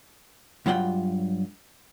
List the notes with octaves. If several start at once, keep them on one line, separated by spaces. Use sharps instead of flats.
G2 F#3 F4 F#5 G5